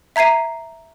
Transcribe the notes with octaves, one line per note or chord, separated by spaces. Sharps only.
E5 A#5 G#6 C7 D#7